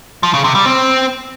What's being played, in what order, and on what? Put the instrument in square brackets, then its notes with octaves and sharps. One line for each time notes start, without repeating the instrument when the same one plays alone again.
[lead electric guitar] F3
C#3
C3
G3
C4